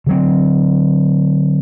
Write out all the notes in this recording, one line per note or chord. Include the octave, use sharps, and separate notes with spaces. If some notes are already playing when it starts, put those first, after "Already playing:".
D3 F#3 C4